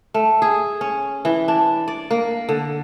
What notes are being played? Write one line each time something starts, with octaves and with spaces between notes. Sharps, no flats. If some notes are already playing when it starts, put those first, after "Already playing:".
A3
G#4
C#4
E3
D4
D5
A#3
D3